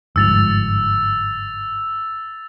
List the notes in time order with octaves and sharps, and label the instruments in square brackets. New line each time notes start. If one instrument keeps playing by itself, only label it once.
[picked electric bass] G1 G#2 F3 [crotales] E6 A6 F7